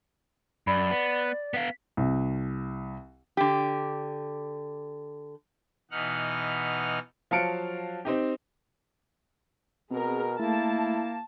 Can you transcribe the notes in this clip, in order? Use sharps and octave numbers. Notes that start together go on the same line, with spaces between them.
F#2 D5 B5
B3
B3 F5 B6
C2
D3 G4
B2 E3 D#4 F#5 F6
F3 F#3 F5 A5 C#7 D7
C4 D#4 G4
B2 C4 G#4 A#4
A3 A#3 E4 A5